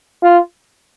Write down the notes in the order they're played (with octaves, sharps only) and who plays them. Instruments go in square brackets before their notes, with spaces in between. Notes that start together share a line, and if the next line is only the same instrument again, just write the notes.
[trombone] F4